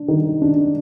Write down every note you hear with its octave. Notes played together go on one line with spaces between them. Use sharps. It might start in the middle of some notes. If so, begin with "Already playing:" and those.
Already playing: D4
D#3
D4